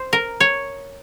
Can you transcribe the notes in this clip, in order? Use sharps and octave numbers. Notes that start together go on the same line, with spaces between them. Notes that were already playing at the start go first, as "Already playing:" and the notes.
Already playing: C5
A#4
C#5